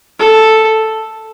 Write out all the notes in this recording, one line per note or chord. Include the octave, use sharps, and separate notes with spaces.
A4